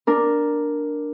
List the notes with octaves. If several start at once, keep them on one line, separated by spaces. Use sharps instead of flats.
D4 A#4